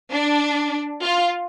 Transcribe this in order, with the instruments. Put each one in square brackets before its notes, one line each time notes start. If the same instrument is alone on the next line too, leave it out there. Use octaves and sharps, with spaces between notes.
[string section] D4
F4